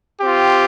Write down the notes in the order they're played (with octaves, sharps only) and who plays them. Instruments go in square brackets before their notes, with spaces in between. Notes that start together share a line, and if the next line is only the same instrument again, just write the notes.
[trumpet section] C4 F4 G4